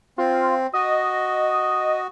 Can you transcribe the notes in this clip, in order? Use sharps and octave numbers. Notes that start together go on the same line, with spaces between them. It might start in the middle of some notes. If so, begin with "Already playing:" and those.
C4 F4
F#4 D#5